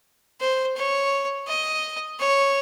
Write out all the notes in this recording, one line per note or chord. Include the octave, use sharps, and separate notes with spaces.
C5
C#5
D#5
C#5